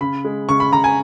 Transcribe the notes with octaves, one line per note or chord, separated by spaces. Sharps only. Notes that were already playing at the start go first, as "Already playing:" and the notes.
C#3 B5
G#3
C#3 C#6
B5
C#3 A#5
G#5